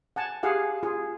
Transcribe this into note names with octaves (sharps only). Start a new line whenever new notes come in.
F#5 G#5 A5
G4 G#4 F5 F#5
F4 G#4